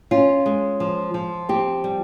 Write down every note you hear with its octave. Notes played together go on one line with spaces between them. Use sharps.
C#4 F4
G#3
F3
F3
C4 G4
G3